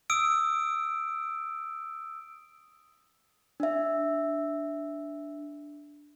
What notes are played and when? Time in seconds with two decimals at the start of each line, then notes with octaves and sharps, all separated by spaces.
0.10 D#6 E6 D7
3.60 D4 E5